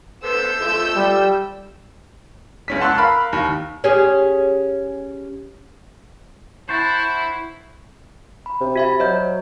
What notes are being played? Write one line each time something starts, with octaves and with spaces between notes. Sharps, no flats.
B3 A4 C5 E6 G6
F3 A3
G3
C#2 C#4 B6
F#5 A5 C6 C#6 E6 F#6
A#4 F5 B5 F6
D#2
C#4 G4 G#4
E4 C5 F#5 A5 C#6
B5
C3
F#4 E5 B5
F#3 C5 D#5 G6